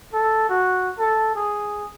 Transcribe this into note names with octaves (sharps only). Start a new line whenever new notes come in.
A4
F#4
A4
G#4